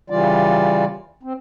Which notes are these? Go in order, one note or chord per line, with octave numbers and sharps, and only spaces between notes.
C#3 E3 G3 F4 D5
C4